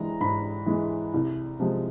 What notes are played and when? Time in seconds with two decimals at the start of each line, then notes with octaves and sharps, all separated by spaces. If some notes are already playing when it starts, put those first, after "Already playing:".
Already playing: E3 G#3 A#5
0.21 G#2 B5
0.66 E3 G#3
1.14 C2
1.60 C3 F3 G#3